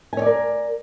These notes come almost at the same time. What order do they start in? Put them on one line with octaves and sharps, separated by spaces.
G#5 C#5 D5 A#4